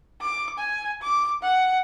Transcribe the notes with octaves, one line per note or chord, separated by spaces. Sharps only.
D6
G#5
D6
F#5